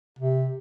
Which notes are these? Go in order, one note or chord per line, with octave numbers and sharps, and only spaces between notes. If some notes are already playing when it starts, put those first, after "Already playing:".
C3